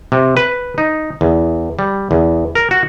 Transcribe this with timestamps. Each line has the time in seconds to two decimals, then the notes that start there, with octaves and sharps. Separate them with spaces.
0.12 C3
0.37 B4
0.78 D#4
1.21 E2
1.79 G3
2.11 E2
2.55 A#4
2.71 F#4